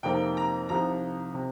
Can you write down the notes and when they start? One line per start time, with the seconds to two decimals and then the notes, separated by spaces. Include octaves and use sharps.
0.03 F2 C3 F3 A#3 D#4 G5
0.37 A#5
0.69 C2 C3 F3 D#4 A#5
1.34 C3